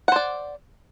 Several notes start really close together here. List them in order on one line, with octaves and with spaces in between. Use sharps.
F#5 C5 D5